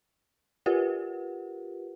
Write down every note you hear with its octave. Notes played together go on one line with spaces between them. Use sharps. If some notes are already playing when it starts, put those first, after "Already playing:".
F4 G4 A#4 B4 F#5